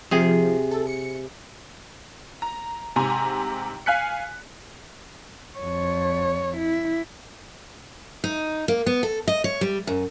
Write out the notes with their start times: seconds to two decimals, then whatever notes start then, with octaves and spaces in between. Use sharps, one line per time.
0.11 C3 F3 G#4
0.71 A4
0.87 C#7
2.42 A#5
2.96 G#2 C3 G#5 A#5 C6
3.86 F5 G#5 F#6 B6 C#7
5.59 F2 C#5
6.57 E4
8.24 D#4
8.68 A#3
8.86 B3
9.03 A4
9.27 D#5
9.44 C#5
9.61 G3
9.87 F#2